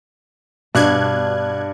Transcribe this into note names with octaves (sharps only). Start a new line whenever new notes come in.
G2 B2 D4 F#6 G#6